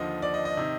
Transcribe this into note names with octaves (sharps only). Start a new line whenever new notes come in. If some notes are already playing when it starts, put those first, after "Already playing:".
Already playing: D#2 D3 F3 D#5
D5
D#5
D#5
C3 D#3